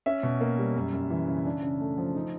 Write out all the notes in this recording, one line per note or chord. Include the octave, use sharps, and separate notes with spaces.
C#4 E5
B2
A#3
G3
F#2
F#2
E3
C#3
D4
C#3
A3
F3
D#4